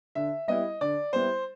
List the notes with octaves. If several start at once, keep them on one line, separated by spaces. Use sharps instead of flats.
D3 E5
G3 B3 E4 D#5
D3 D5
G3 B3 E4 C5